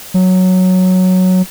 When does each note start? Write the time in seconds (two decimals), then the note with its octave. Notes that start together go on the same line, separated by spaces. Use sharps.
0.14 F#3